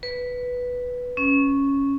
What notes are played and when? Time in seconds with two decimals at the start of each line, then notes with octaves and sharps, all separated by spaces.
0.03 B4
1.17 C#4